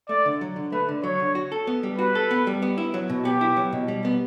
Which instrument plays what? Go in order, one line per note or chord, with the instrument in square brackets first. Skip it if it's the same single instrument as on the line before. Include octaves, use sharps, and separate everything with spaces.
[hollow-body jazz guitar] A3 [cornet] D5
[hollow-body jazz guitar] D3
F#3
D3
[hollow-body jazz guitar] A3 [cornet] B4
[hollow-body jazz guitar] D3
[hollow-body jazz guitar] F#3 [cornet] C#5
[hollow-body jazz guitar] D3
F#4
A4
B3
G3
[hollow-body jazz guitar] F#4 [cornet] B4
[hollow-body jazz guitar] A4
B3
G3
B3
E4
F#3
B2
[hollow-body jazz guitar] B3 [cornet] G4
[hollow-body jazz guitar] E4
F#3
B2
G3
B3